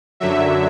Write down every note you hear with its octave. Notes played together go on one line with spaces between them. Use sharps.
F#2 D3 F#3 E5